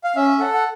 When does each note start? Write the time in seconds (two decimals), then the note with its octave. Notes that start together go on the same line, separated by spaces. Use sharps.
0.04 F5
0.16 C#4 E5
0.39 A4 F#5
0.54 F#5